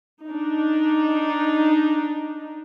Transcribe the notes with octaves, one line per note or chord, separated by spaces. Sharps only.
D4 D#4